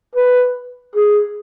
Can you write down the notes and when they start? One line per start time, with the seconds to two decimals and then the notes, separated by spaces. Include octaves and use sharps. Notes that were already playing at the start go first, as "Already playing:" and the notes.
0.15 B4
0.96 G#4